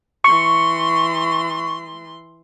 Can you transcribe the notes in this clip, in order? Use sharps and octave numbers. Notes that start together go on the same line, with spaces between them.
E3 C6 C#6